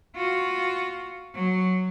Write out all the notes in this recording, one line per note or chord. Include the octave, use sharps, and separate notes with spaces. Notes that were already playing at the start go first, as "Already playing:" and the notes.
F4 F#4
F#3